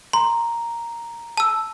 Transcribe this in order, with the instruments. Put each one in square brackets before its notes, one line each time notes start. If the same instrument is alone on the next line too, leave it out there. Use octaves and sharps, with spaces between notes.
[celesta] A#5 [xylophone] C6
[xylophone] A5 E6